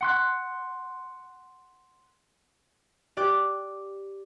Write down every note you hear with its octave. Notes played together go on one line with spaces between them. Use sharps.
F#5 C6 F#6
G4 D5 D6 F#6